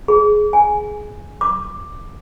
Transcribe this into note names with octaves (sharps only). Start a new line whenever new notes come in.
G#4
G#5
D6